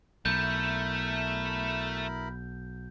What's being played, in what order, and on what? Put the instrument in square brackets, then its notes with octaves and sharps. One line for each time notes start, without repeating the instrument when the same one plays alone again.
[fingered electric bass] B1 [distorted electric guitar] A3 [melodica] E4 A#4 B5 [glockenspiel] G6